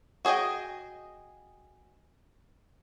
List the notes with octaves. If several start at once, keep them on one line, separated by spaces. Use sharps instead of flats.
F#4 G#4 C5 D#5 G5